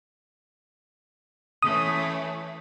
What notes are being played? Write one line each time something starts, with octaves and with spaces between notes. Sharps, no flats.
E3 A3 C#4 D#6